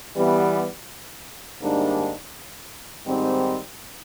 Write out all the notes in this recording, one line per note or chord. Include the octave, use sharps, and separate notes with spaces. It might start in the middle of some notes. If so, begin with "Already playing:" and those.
E3 G3 B3
G#2 D#3 G3 A#3 D4
G#2 D#3 G3 C4